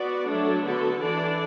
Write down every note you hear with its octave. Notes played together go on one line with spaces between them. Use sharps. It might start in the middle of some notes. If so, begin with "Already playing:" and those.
Already playing: B3 F#4 D5
F#3 A3 D4 A4
D3 B3 F#4 A4
E3 D4 A4 D5